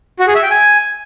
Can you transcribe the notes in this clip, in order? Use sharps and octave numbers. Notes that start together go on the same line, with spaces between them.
F#4
G#4
E5
G5
G#5